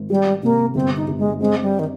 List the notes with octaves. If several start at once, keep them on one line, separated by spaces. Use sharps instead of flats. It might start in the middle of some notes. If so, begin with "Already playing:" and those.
Already playing: G#1
G3 G4
C3 A#3
G1 C4
D#4
G1
G#3
G#3 C4
G3
D#3